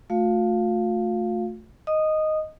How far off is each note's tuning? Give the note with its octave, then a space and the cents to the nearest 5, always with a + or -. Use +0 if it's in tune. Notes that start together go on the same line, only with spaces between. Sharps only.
A3 +0 F4 +45 F5 +0
D#5 +0 D#6 -15